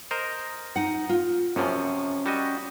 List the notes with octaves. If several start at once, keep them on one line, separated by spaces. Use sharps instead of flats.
A#4 C5 D#5
D#4 F#5
F4
F#2 C3 F3 C#4
G3 F#4 D#5